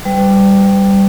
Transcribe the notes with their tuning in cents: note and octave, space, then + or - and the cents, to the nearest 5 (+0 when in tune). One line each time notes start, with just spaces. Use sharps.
G3 +0 B4 +45